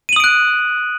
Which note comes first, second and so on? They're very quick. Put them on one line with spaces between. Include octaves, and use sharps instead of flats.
D#7 F#7 D#6 D7 F#6